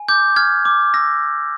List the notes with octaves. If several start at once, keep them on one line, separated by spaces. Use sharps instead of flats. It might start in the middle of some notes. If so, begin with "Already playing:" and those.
Already playing: G#5
D6 G6
F6 G#6
D6
E6 A#6